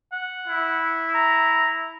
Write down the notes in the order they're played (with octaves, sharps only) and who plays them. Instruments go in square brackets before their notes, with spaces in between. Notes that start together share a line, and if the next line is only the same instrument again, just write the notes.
[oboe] F#5
[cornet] E4
[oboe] A#5